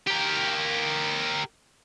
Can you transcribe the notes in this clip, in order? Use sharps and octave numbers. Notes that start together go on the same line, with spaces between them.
G4 A#4